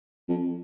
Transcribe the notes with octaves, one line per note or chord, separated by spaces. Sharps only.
F2